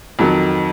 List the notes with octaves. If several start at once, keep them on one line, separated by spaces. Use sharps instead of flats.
F2 D#3 F#3